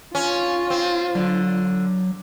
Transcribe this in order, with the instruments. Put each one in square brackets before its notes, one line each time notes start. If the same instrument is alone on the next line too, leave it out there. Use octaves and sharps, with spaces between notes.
[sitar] C#4 [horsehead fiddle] F4
[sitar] C4
[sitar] D3 [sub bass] F#3